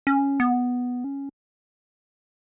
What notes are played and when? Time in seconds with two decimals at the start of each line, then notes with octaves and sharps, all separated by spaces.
0.07 C#4
0.40 B3
1.04 C#4